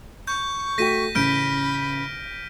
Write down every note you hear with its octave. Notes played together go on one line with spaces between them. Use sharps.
C#6 G6
A3 F#4 G5 A#6 B6 D#7
A1 C#3 B5 F6 G6 D7